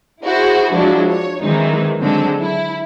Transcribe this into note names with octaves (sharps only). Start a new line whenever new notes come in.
E4 F#4 G#4 C5
F3 F#3 G#3 D4 E4
C#5
D#3 E3 F#3 G#3 C4 D#4
D3 F#3 G#3 C4 A4
E4